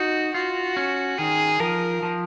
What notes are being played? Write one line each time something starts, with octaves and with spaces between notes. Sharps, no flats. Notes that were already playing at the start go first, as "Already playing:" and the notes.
Already playing: D#4 F#4
F4 F#4
C#4
D#3 G#4
F3 A#4
F3